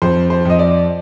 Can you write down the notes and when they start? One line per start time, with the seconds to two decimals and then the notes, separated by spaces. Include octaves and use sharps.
0.02 F2 C5
0.30 C5
0.45 F2 D#5
0.59 D5